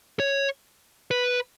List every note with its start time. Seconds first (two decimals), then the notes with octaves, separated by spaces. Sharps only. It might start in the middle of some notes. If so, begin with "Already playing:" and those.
0.20 C#5
1.11 B4